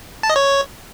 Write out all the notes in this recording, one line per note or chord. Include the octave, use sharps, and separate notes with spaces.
A5
D#5
C#5